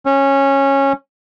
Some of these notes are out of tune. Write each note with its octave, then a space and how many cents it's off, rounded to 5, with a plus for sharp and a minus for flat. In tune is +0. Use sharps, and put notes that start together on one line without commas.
C#4 -15